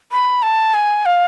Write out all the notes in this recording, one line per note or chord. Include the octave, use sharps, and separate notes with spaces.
B5
A5
G#5
F5